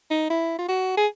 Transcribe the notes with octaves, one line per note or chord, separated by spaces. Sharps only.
D#4
E4
F4
F#4
G#4